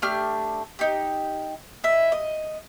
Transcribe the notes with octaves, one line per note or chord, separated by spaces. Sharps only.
A3 D4 G4 F6
D#4 G4
E4 D#5 E5
D#5